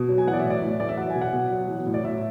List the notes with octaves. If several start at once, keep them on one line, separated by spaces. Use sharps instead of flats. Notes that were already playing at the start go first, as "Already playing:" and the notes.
Already playing: B2
F#3
G#5
E3 F#5
D5
E5
A2
D5
A2
E3 D5
E5
F#3 F#5
G#5
B2 E5
F#5
B2
F#3
E3
A2
D5
A2 E5